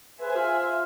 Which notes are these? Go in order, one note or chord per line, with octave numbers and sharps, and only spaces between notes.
G#4 B4 C5 E5 G#5
F4